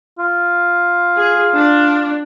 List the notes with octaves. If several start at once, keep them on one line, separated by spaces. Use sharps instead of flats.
F4
G#4
D4